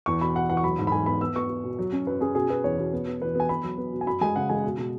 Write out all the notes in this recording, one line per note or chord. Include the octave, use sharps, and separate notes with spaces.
E2 C#6
B2 B5
B2 F#5
E2 F#5
C#6
F#3 B5
G#2
B5
G#2 G#5
B3 B5
B3 E6
B3 C#6
B3
B2
F#3
C#4
F#2 B4
C#4 G#4
B2 G#4
B2 B4
E2 C#5
B2
B3
B3
E2 B4
B3 G#5
B3 B5
F#3
B3
B2
G#5
F#2 B5
G#3 G#5
C#3 F#5
G#3 G#5
B2
B2